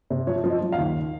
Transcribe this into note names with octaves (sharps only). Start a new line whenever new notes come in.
C3
F3 C#5
F3
D#5
F3
F5
D#2